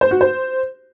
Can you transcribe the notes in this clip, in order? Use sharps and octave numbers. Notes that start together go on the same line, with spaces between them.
C5
F#4
C5